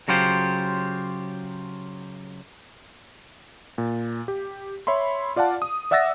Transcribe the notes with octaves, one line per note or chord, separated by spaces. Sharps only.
C#3 F#3 F4 G4 C5
A#2
G4
C#5 E5 B5 C6
F4 D5 F5 F#5 A5
D#6
D5 E5 F#5 E6 A6 A#6